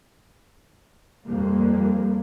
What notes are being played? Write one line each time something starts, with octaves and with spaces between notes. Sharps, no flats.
F2 G3 A#3